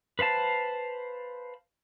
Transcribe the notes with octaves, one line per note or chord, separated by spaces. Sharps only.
B4 C5 F5 A5